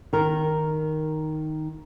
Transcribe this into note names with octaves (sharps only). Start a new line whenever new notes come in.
D#3 A#4